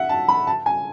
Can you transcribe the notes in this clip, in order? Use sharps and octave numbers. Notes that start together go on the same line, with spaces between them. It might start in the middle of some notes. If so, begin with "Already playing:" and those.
Already playing: E5 F#5
A5
B5
A5
G#5